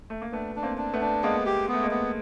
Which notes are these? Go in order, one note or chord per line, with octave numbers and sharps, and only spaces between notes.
A3
A#3
A3 B3 D4
D4
A#3 C4
D4
A3 B3
D4
G#3 A#3 B3
G4
A3 B3
G#3 A#3
B3